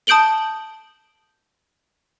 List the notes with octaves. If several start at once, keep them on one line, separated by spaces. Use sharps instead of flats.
A5 D#6 G6 D7 F#7 G7